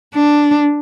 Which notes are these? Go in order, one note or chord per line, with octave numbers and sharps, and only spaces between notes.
D4